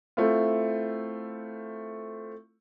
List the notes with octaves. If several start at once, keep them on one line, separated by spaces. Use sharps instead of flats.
A3 C4 E4 F4